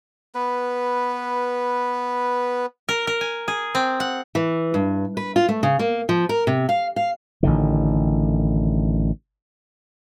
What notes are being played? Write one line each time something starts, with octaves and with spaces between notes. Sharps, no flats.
B3 B4
A#4
A#4
G#5
G#4
C4
F#5
E3
G2
B4
F4
A3
C#3
A#3
F3
A#4
C3
F5
F5
A1 D3 D#3